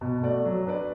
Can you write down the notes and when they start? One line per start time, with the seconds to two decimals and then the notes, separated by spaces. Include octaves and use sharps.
0.01 B2
0.22 A3 F#4 D5
0.45 F#3
0.66 D4 B4 D5